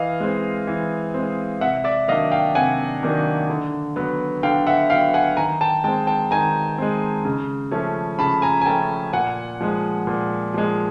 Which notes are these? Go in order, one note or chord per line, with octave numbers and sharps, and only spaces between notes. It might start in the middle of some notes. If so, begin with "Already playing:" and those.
Already playing: E3 D#5 F5
G#3 C4
E3
G#3 C4
C3 E5 F#5
D5 E5
D#3 F#3 A#3 D4 D#5 F5
F5 G5
C3 F#5 G#5
D#3 F#3 A#3 D4
D3
F#3 B3
D3 F5 G5
E5 F#5
F#3 B3 F5 G5
F#5 G#5
D#3 G#5 A#5
G5 A5
G#3 C4 G5 A5
G5 A5
D#3 G#5 A#5
G#3 C4
C#3
F3 A3 C#4
C#3 A5 B5
G#5 A#5
G#5
F3 A3 C#4 G5 A5
A#2 F#5 G#5
F3 G#3
A#2
F3 G#3